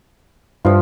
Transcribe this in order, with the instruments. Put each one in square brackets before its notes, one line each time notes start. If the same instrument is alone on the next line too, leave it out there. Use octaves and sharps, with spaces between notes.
[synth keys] G2 [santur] F3 F4